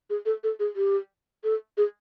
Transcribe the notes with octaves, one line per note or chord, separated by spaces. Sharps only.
G#4
A4
A4
G#4
G4
A4
G#4